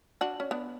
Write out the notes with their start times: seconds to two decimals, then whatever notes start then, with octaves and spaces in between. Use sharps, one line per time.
0.21 D4 F#4
0.40 C#4
0.51 B3 D4